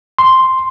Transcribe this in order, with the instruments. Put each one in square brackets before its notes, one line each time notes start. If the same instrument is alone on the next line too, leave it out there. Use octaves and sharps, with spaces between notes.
[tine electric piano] C6